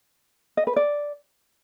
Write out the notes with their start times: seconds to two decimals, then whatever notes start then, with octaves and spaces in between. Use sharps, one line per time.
0.57 D#5
0.67 B4
0.76 D5